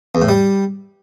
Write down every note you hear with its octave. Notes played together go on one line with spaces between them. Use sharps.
E2
A2
G3